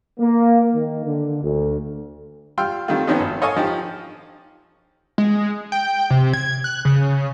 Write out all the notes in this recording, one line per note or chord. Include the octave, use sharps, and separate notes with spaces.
A#3
D#3
D3
D2
G3 F4 G5 C6 E6 F6
D#3 G3 A3 C4 F4
D#3 F3 B3 C#4 D#4
G#1
A4 C#5 D#5 F5 G#5 C#6
F3 D#4 G4
G#3
G5
C3
G#6
F#6
C#3